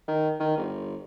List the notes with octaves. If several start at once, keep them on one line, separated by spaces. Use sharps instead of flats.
D#3
D#3
G1